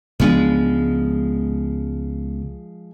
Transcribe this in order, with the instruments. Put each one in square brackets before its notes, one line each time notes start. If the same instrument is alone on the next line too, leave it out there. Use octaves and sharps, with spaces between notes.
[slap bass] C#2 B3 D4 [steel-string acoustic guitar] F3 G#3